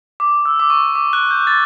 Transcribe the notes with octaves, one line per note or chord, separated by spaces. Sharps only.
D6
E6
D6
C#6
D6
F#6
G6
A6